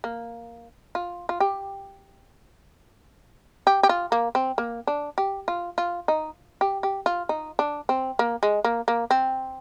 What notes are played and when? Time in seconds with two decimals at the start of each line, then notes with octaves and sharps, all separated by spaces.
0.04 A#3
0.95 F4
1.29 F4
1.40 G4
3.67 G4
3.83 G4
3.89 F4
4.12 A#3
4.35 C4
4.58 A#3
4.87 D4
5.18 G4
5.48 F4
5.78 F4
6.08 D#4
6.61 G4
6.83 G4
7.06 F4
7.29 D#4
7.59 D4
7.89 C4
8.19 A#3
8.43 G#3
8.64 A#3
8.88 A#3
9.11 C4